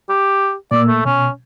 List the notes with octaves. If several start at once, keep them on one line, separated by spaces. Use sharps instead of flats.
G4
A#2 A#3 D5 E6
A3
B2 C#4